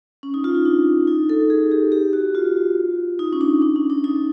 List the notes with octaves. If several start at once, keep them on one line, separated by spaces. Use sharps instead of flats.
C#4
D#4
F4
D#4
D4
D#4
A4
G#4
G4
G4
F#4
F4
D#4
C#4
D4
D4
C#4
D4
D#4